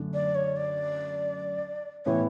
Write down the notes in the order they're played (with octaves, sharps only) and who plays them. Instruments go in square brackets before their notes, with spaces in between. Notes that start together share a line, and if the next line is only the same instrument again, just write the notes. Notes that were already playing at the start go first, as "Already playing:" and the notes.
Already playing: [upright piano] F#2 D3 A3 D4
[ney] D5
C#5
D5
[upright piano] A2 E3 B3 E4 [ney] C#5